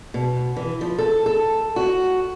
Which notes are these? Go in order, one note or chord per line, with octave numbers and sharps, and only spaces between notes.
B2
E3
F3
A4
A4
F#4